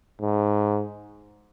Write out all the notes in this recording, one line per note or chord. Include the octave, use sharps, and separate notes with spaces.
G#2